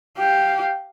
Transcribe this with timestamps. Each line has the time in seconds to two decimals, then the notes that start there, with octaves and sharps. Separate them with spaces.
0.18 G4 F5